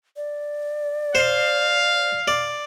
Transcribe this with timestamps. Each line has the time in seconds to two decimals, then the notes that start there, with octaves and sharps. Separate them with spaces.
0.17 D5
1.15 C5 F5
2.28 D5